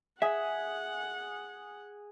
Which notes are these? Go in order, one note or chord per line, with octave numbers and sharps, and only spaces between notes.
G#4 E5 F#5